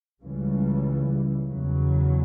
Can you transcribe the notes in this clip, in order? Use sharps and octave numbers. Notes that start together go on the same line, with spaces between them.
C#2 C#3 E3 G3
E2 C#3 F#3